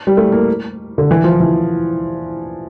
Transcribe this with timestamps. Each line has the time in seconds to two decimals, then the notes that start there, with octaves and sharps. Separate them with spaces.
0.07 G3
0.17 A3
0.32 A#3
0.98 D3
1.11 E3
1.24 F3
1.40 E3